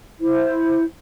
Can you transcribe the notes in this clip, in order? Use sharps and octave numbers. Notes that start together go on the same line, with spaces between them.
E4 C5